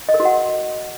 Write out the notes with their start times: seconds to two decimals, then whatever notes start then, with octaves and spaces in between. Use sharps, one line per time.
0.09 D#5
0.14 A#4
0.20 F#4
0.25 F#5